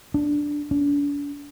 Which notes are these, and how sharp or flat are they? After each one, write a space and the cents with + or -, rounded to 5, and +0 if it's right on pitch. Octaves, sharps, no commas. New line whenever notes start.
D4 +0
D4 -40